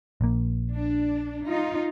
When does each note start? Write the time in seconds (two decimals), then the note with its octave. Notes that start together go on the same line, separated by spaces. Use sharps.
0.21 A#1 A#3
0.72 D4
1.45 D#4 F4